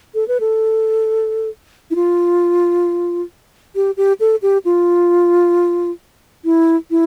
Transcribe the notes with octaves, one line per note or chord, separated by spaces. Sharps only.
A4
B4
A4
E4
F4
G4
G4
A4
G4
F4
E4
E4